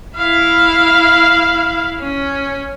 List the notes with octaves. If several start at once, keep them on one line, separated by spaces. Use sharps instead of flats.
E4 F5
C#4